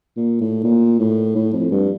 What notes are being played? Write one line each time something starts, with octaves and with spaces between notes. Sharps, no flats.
A#2
A2
A#2
A2
A2
F2
G2